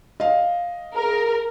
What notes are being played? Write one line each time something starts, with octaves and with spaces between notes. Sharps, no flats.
D#5 F5
G#4 A#4